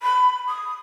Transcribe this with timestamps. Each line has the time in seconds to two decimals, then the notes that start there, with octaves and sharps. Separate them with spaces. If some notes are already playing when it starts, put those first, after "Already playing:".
0.02 B5
0.47 D#6